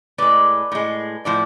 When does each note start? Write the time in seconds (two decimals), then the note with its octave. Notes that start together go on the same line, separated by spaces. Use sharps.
0.18 A2 G#3 B4 D5
0.72 A2 G#3
1.25 A2 F3 D5